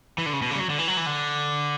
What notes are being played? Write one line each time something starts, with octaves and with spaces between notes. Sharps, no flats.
E3
D3
C#3
B2
C#3
G3
F#3
D3
E3
F#3
E3
D3